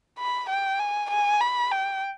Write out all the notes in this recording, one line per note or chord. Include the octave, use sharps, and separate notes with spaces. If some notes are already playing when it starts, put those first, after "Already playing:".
B5
G5
G#5
G#5
B5
G5